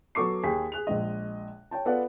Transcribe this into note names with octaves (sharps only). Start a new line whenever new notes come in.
F#3 B3 A4 C#6 D6 C7
D#2 G#4 G5 B6
G#4 F#6 F7
A#1 G#3 D#5
C#5 G5 A5
B3 F4 A4 B4 D5 F#5